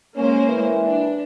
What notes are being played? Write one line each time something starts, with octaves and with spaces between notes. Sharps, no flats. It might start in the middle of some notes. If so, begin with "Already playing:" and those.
G#3 A#3 C#4 C5
E3
D4